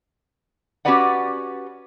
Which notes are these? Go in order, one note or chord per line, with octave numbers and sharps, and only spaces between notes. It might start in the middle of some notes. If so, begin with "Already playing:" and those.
C#4 F#4 G4 B4 D5 F#5